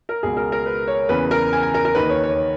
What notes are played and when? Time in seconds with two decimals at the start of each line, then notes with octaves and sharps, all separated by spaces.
0.09 A#4
0.23 C#2 B2 G#4
0.37 A#4
0.52 A#4
0.66 B4
0.87 C#5
1.09 E2 C#3 E3 B4
1.31 A#4
1.53 G#5
1.63 G#5
1.74 A#4
1.85 A#4
1.95 D#2 D#3 B4
2.09 C#5
2.23 C#5